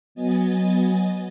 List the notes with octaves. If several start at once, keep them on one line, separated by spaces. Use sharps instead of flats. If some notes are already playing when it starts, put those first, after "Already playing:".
F#3 B3 D#5 G#5 A6